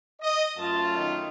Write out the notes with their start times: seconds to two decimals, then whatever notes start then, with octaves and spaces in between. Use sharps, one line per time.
0.21 D#5
0.58 F#2 A3 F4 A5
0.94 D#3